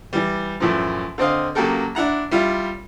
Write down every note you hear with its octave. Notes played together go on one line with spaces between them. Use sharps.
E3 G3
F#2 A2 E3 F3
D3 C4 D#5 F5
C#3 F#3 A#3 G4 A4 A#4
D4 E4 F#5 A#5
G3 E4 F4